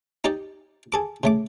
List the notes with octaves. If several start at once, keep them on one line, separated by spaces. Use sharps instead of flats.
D#4 G4 D5 G5
G#4 A4 D6
C#3 A3 D6